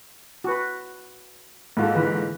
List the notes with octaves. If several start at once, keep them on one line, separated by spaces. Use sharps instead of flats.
F#4 B4
G#2 A#3 F4 F#4 A4
D3 E3 B4